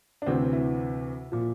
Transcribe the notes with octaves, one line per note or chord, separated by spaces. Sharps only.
D4
D2 C3 E3 C4
E4
A#2 F3